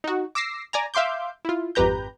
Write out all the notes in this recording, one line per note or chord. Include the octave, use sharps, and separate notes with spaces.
D#4 F#4
D6 E6 A#6 C7
D5 G#5 A#5
E5 F5 C6 D6 G6
E4 F4
G#1 F2 G4 B4 A#5 G6